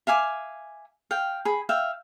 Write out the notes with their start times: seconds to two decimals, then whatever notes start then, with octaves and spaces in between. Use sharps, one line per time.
0.07 E5 F5 G#5 D6
1.11 F5 G5
1.45 G#4 B5
1.69 E5 F5 G5